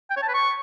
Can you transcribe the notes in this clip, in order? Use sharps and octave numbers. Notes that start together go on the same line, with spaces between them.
G5
C#5
A5
B4
C#6